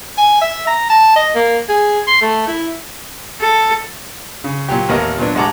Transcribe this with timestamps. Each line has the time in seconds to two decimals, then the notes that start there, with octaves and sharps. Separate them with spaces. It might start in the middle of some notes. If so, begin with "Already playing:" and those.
0.18 G#5
0.41 E5
0.67 A#5
0.90 A5
1.16 D#5
1.35 A#3
1.69 G#4
2.07 C6
2.21 A3
2.47 E4
3.41 A4
4.44 C#3
4.69 A#2 F#3 G4
4.89 A1 D#2 B3 A#4 D#5 A#5
5.18 A#2 F#3 B3 D4
5.35 A1 G#3 F#5 A5 A#5 D6